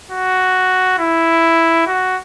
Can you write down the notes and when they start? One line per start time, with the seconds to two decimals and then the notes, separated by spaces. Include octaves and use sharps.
0.11 F#4
0.99 E4
1.87 F#4